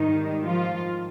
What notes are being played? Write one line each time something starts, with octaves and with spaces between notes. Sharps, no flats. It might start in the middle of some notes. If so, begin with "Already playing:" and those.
Already playing: G#2 D#3 G3 D#4
F3 F4